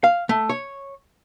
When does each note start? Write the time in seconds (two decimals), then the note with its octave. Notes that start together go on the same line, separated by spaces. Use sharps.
0.04 F5
0.29 A3
0.49 C#5